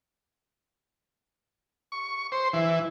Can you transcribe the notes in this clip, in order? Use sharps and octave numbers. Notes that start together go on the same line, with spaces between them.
C#6
C5
E3